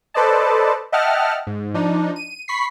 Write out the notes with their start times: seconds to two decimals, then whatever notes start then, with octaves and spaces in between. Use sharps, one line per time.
0.14 A4 B4 C5 D5 D#5 A5
0.92 D#5 E5 F#5 G5 A5 F6
1.47 G#2
1.74 F3 D4 D#4
2.16 D#7
2.48 B5 C#6 B6 C7